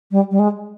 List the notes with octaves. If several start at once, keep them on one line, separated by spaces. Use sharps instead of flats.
G3
G3
G#3